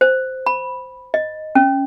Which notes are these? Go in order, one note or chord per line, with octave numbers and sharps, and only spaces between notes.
C5
B5
D#5
C#4